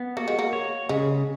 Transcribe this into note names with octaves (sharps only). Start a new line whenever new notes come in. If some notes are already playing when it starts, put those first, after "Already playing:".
Already playing: B3
A#3 F#4
G#3
A#3
C#5
C#3 G#3